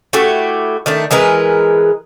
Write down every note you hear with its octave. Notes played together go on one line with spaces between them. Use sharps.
A3 E4 F#4 G4
D#3 A3 D4
E3 G#3 A#4 B4